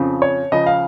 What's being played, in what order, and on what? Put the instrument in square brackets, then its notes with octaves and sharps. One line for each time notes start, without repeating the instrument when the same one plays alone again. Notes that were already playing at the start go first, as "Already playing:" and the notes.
Already playing: [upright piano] F2 C#3 F3
C#5
C#2 C#3 F3 D#5
F5